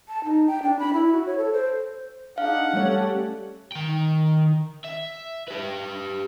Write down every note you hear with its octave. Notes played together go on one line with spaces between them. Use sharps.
A5
D#4
G5
D4
B5
E4
F#4
C#5
A4
C5
D4 D#4 G#4 F5 F#5
G3 A3 C#4 G4 A4 C#5
D#3 G5
E5
G4 B4